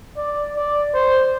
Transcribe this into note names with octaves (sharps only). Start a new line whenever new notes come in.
D5
D5
C5